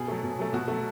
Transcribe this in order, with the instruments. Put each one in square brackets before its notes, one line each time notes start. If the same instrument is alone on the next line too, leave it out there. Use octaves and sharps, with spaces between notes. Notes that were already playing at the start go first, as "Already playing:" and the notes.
Already playing: [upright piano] B2 G#4
F#3 A3
B2
F#3 A3
B2 F#4
F#3 A3